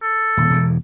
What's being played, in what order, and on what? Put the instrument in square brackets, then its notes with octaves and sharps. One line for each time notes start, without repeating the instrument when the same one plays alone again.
[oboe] A4
[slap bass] D#1
E1 E2